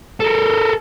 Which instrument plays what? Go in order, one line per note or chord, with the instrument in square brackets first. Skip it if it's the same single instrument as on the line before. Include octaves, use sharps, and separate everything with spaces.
[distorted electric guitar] A4 A#4